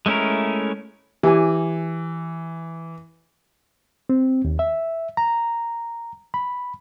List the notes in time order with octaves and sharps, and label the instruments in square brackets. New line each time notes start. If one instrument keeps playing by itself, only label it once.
[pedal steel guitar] G#3 A3 C#4 E4 A#4
[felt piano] E3 [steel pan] G4 G#5
[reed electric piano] C4
D#2
E5
A#5
B5